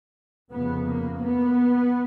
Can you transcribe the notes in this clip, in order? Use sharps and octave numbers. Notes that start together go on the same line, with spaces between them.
F1 F2 C#3 B3
A#3
B3